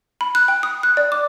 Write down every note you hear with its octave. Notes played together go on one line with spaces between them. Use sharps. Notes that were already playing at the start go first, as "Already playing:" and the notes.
B5
F#6
G5
D#6
F#6
D5
D6